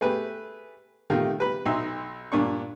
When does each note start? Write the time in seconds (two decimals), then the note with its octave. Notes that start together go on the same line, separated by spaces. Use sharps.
0.01 A3 G4 G#4 B4
1.10 C3 D#3 A3 F4 G4
1.39 G3 B4 B5
1.66 B1 D#4 E5 C6
2.32 G2 A#2 D4 C#6